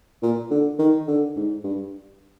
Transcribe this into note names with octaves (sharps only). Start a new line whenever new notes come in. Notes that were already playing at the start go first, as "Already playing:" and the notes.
A#2
D3
D#3
D3
G#2
G2